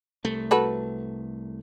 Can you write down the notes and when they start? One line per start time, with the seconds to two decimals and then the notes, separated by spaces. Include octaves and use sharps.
0.25 C2 A3
0.51 F#4 A4 B4